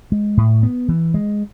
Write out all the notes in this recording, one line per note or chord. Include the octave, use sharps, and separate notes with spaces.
G#3
A2
B3
E3
G#3